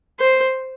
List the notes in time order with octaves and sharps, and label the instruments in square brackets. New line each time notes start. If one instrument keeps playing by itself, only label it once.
[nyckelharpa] C5